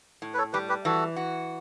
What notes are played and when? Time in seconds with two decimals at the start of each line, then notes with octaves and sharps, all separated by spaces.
0.22 A2
0.34 B4
0.38 A4 C#5
0.53 G3 G4 B4
0.69 G4 B4
0.85 E3 F#4 A4
1.16 F#4